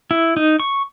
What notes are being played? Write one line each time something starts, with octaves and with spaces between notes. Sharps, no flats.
E4
D#4
C#6